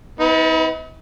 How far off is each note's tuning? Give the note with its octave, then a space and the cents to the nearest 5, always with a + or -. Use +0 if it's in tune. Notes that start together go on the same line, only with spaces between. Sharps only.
B3 +45 D#4 +45 B4 +0